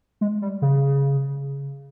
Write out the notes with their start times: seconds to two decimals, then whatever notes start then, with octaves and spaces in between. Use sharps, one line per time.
0.21 G#3
0.42 G3
0.62 C#3